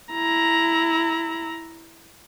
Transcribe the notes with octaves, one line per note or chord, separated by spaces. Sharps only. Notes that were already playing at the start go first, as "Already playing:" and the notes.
E4 A#5